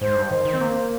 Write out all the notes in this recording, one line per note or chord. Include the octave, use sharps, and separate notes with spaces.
G#2 C5
G2
D#3 C5
D#3
C4
A#3